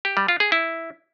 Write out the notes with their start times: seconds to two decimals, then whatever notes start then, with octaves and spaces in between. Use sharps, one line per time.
0.05 G4
0.17 G3
0.28 F4
0.40 G#4
0.52 E4